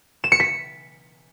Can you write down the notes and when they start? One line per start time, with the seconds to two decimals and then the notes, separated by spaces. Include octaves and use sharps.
0.24 E7
0.32 C#7
0.40 B6